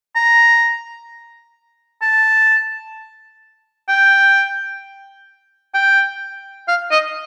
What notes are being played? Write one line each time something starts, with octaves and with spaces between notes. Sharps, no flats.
A#5
A5
G5
G5
F5
D#5